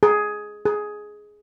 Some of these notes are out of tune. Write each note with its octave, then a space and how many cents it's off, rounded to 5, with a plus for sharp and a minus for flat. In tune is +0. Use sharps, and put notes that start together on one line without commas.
G#4 +10
G#4 +10